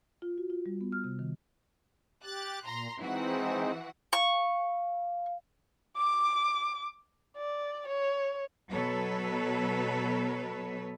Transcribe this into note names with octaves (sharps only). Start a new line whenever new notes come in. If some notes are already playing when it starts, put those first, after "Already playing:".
F4
F#4
F4
G3
B3
F6
C3
D#3
G4 F#6 A6
A#2 A#5 C6
E3 G#3 C4 D#4 F#4 F#5
F5 C#6
D6
D5
C#5
B2 F#3 A4 B4 C#5